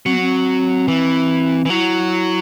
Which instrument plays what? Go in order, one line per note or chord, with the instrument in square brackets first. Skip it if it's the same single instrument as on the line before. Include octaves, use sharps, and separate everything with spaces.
[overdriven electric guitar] F#3 [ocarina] C4
[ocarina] B3
C4
[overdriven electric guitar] E3
E3
[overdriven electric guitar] F#3 [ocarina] E4